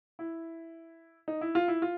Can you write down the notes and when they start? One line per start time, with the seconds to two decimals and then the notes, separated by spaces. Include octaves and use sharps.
0.19 E4
1.28 D#4
1.41 E4
1.55 F4
1.68 E4
1.82 F4